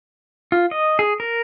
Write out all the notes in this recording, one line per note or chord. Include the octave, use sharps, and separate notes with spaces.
F4
D#5
G#4
A#4